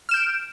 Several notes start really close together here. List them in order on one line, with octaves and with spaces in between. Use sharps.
F6 E7 G6 D7